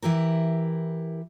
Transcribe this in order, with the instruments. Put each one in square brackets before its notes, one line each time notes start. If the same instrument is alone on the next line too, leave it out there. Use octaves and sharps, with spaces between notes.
[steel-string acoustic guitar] E3 E4 G4 A#4